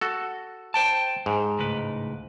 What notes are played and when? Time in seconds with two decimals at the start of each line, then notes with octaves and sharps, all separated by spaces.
0.01 F#4 A4
0.74 C5 G5 A5
1.26 G#2
1.59 C#2 A2 B4